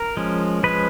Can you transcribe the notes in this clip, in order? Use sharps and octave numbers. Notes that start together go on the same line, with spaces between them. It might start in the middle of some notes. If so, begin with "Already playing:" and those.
Already playing: A#4
F3 G#3 C#4
F3 G#3 C#4 B4